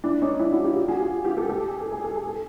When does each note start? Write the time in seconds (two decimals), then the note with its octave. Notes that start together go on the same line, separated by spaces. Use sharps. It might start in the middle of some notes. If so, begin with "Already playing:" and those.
0.04 D4 E4
0.22 C#4 D#4
0.39 D4 E4
0.51 E4 F#4
0.64 F4 G4
0.76 F4 G4
0.88 F#4 G#4
1.00 F4 G4
1.25 F4 G4
1.37 G4 A4
1.49 G4 A4
1.67 G#4
1.80 A4
1.92 G#4
2.04 A4
2.16 G#4
2.27 A4